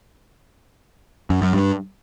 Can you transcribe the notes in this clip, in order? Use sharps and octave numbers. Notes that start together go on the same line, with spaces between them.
F#2
F#2
G2